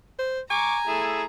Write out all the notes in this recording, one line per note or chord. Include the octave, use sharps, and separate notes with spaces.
C5
G#5 A#5 C#6 D6
A3 E4 G#4